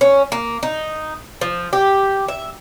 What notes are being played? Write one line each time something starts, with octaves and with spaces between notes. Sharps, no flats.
C#4
A#3
D#4
F3
G4
E5